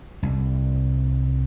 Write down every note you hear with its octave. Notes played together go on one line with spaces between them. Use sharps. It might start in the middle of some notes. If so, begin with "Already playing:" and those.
C2